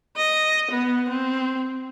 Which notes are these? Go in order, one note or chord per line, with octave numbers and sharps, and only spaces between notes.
D#5
B3
C4